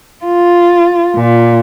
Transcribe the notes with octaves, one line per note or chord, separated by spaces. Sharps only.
F4
A#2